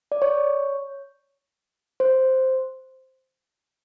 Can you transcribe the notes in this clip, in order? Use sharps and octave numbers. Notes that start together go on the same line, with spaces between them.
D5
C#5
C5